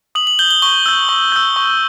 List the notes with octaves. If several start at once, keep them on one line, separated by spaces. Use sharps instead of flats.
D#6 F#7
F#7
G6 G7
G7
C#6 G7
E6 G6
C#6
E6 G6
C#6